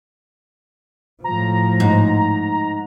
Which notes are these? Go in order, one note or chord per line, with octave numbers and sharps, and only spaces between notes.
A2 F3 A#5
G#2